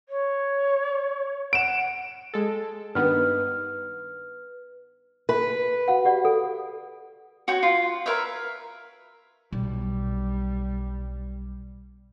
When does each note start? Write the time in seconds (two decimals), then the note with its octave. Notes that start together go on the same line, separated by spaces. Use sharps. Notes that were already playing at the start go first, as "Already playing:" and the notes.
0.09 C#5
1.53 F#5 D7 E7
2.34 G#3 A4
2.95 G2 D#3 B3 B4 F6
5.29 B4
5.88 F#4 F5 F#5
6.05 G4 D5 F#5
6.25 A4
7.48 F#4 C#5 G5
7.63 F4
8.06 A#4 B4 C#5 E5
9.52 B1 G3